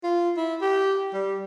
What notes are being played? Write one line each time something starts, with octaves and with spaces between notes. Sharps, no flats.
F4
E4
G4
G3